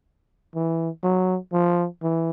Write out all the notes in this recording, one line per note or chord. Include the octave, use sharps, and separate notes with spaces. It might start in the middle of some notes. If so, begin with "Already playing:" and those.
E3
F#3
F3
E3